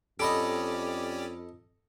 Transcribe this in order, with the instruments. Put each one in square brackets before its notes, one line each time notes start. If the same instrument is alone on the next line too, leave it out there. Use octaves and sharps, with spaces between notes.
[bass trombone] F2 [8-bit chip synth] C#4 G4 D5 [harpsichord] A4 D#5 [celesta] B5 D7